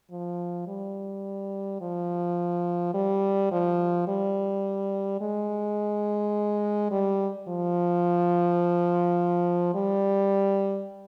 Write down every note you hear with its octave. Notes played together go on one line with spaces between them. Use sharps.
F3
G3
F3
G3
F3
G3
G#3
G3
F3
G3